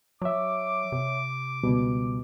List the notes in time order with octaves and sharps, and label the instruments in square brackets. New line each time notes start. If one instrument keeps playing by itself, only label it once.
[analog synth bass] F#3 [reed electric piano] C#5 E5 [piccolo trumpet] D6
[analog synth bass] C3
[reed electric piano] C#2 B2 G3